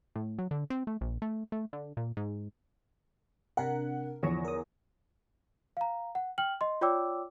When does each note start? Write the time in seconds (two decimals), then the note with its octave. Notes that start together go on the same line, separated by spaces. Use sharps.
0.16 A2
0.39 F#3
0.51 D3
0.70 C4
0.87 A3
1.01 A#1
1.22 A3
1.52 A3
1.73 D3
1.97 A#2
2.17 G#2
3.57 C3 D4 A#4 F#5
4.23 E2 D3 F3 C#5 C#6 A#6
4.45 A#4 D#6
5.77 F5 A#5
6.15 F#5
6.38 G5 F6 F#7
6.61 D#5 C6
6.81 F4 C#5 D5 G5 D6 E6